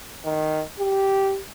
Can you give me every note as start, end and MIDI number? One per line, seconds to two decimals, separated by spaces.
0.25 0.63 51
0.79 1.39 67